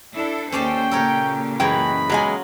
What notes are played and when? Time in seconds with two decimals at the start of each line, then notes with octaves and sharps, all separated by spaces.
0.13 D4 E4 A4
0.52 D#2 C#4 A4 C5 D5 G5 A5
0.91 A#2 C#3 G4 A4 A#4 C#5
1.60 F#2 E3 G#3 F#4 D#5 G5 B5
2.09 E2 F#3 G#3 F4 G#5